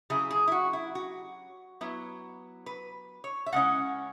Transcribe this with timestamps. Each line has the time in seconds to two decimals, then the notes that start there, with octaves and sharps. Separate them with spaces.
0.10 C#3 F#3 E4 G#4
0.31 G#4
0.48 E4
0.52 F#4
0.73 E4
0.95 F#4
1.81 F#3 B3 E4
2.66 B4
3.24 C#5
3.46 E5
3.53 C#3 G#3 C#4 E4 F#5